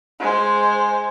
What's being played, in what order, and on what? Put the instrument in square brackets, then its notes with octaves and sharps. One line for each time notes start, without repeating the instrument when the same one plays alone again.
[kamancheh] G#3 C5